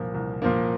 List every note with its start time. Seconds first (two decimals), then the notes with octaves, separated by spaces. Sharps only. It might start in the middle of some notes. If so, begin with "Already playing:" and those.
Already playing: C2 A#2 F3 A#3
0.14 C2
0.42 A#2 F3 A#3